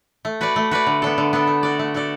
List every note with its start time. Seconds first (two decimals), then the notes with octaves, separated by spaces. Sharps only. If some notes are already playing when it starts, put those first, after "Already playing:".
0.25 A3
0.41 F#4 B4 D5
0.56 A3
0.71 F#4 B4 D5
0.87 D3
1.02 B3 D4 A4
1.18 D3
1.33 B3 D4 A4
1.47 A3
1.63 F#4 A4 D5
1.79 A3
1.94 F#4 A4 D5